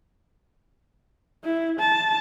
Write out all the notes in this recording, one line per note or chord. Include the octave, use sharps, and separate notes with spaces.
E4
A5